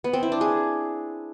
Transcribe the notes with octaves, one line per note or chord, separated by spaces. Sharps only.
B3
C4
E4
D4
G#4